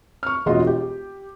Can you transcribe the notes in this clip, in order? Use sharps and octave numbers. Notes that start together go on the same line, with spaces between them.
C#6 F6
E1 G#3 F4 F#4 D#5
G4